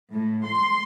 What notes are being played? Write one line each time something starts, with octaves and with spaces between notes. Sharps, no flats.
A2
C6